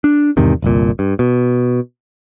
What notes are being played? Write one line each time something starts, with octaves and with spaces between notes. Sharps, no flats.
D4
E2 G#2 C3 D#3
G1 C2 A#2
G2
B2